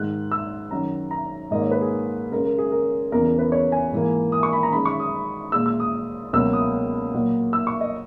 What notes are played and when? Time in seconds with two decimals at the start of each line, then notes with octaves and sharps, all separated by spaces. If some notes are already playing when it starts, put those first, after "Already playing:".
Already playing: G#2 D#3 G#3 F#6
0.32 E6
0.71 F#2 D#3 F#3 A#5
1.11 A#5
1.51 G#2 D#3 A#3 D#5
1.62 C#5
1.71 B4
1.81 G#4
2.32 F#2 C#3 G#3 A#4
2.45 A#4
2.58 G#4
2.72 A#4
3.12 E2 C#3 E3 A#4
3.26 A#4
3.39 B4
3.52 C#5
3.72 G#5
3.92 G#2 E3 A#3
4.32 D#6
4.43 C#6
4.53 B5
4.63 A#5
4.72 F#2 D#3 G#3 B5
4.86 C#6
5.00 D#6
5.52 A#2 G#3 E6
5.66 E6
5.80 D#6
6.33 C#2 B2 F#3 A#3 E6
6.53 D#6
7.14 A#2 F#3 A#3
7.53 E6
7.67 C#6
7.81 D#5